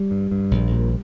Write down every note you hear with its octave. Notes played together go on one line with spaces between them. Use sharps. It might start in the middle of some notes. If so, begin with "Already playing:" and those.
Already playing: G3
G2
G2
A#1
A#2